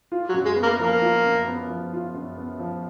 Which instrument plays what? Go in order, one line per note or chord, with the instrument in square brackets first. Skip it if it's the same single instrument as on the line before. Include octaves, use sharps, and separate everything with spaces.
[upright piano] F4
[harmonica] F#3
[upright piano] F#2
[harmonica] G#3
[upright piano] B3
[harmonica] A#3
[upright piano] F3 [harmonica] A#3
[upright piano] F4
F#2
B3
F3
F4
F#2
B3
F3